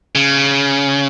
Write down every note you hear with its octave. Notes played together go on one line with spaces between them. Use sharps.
C#3